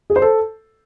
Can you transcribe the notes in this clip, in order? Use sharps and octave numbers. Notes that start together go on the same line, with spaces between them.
G#4
C5
A4